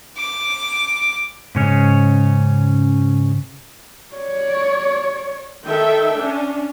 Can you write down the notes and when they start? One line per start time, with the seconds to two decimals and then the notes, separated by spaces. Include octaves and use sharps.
0.17 D6
1.55 G#2 C#3 C#4
4.14 C#5 D5
5.66 D#3 A4 E5 G5
6.17 C#4 D4